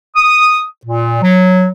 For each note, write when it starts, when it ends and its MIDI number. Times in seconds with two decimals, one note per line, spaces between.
0.16 0.62 87
0.86 1.21 46
1.22 1.67 54